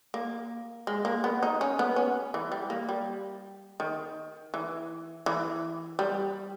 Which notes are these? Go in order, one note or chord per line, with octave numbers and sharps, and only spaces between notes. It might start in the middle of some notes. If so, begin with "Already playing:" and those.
A#3
G#3
A#3
B3
D#4
C#4
B3
C#4
E3
G3
A#3
G3
D#3
E3
E3
G3